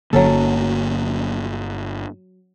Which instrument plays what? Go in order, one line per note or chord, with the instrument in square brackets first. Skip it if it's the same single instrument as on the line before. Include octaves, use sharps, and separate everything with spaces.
[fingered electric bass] G1 D3 A#3 [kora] F#3 C#4 A4